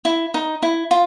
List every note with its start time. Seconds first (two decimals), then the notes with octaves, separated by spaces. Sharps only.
0.05 E4
0.34 D#4
0.63 E4
0.91 F4